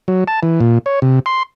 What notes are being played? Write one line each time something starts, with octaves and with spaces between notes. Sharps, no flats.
F#3
A5
E3
A#2
C#5
C3
C6